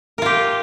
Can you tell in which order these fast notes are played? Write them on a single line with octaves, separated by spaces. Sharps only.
A#4 F4 G4